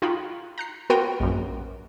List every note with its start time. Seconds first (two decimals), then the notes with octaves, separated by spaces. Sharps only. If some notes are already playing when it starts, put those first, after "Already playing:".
0.02 D#4 F4 F#4 G5 B5
0.58 A#5 F#6 C7
0.90 B3 F4 F#4 A#4 G5 D#7
1.20 A#1 F#2